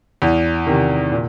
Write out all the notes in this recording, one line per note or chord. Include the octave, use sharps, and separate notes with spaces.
E2
C3 D#3
A#2